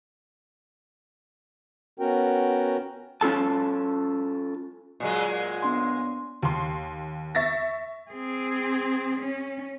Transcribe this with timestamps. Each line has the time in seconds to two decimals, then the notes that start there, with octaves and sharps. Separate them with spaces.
2.00 B3 C#4 F#4 A#4 G5
3.21 C#4 F4 A4 A5
5.00 A#2 F#3 G#3
5.63 B3 D4 C6
6.42 D#2 C6
7.35 E5 C#6 A6 A#6
8.11 C4 G#4
9.20 C#4